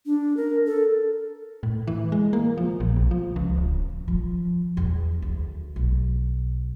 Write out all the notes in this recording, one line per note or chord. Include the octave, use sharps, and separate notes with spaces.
D4
A#4
A4
A2
E3
G#3
A#3
F3
A#1
B1
F3
C#2
D1
F3
E2
D2
B1